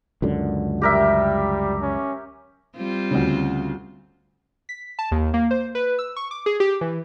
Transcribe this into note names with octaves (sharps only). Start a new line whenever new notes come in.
C#2 F#2 D3
G3 G4 A#4 E5
C#4
G3 C4 F4
D2 C#3
B6
A5
D#2
A#3
C5
B4
E6
C#6
D6
G#4
G4
E3